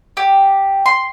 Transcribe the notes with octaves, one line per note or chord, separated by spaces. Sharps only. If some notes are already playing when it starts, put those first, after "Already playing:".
G4
C6